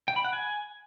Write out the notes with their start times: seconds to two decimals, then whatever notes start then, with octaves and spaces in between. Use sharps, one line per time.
0.08 G5
0.16 B5
0.25 F#5
0.33 G#5